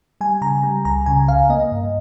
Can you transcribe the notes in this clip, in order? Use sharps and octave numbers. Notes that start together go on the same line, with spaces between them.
G3 G#5
C#3 A#5
G3
C#2 A#5
C#3 G#5
C#2 F5
A#3 D#5
G2